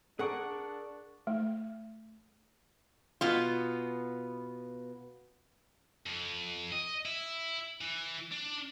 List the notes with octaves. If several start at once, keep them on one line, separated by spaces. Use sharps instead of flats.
D4 G#4 A#4 D5 F#5 C#6 F#6
A3
B2 B3 F4
F2
D#5
E4
E3
D4